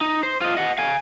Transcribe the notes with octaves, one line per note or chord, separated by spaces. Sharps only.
D#4
C5
F4 D#5
D#5 F#5
F5 G#5